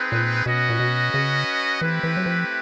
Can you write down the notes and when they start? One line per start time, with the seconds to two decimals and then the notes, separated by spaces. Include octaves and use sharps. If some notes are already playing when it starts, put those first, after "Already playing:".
Already playing: C4 D#4 G#4 B4
0.12 A#2
0.46 B2 C#4 F#4 B4 D#5
0.69 A#2
0.80 B2
1.14 C#3
1.81 E3 A3 C4 E4 G4 B4
2.03 E3
2.17 F#3
2.26 F3